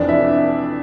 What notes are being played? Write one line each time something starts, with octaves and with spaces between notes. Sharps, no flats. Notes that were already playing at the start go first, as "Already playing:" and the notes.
Already playing: F1 F2 E3 D4 D5
E4 E5